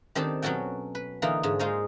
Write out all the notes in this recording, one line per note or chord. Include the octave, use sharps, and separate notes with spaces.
D#3 C4 D4 G4 A4
B2 F#3 C#4 F#4 A4 G5
B4
D3 E3 A#3 D#4 F4
G#2 D3
G#3 D#4 F4 C5 C#5 D#5